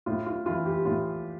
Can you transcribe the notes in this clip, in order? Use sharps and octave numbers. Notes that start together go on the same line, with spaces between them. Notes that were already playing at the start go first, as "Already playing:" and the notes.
A2 F4
F4
E3 F4
G4
A2 F4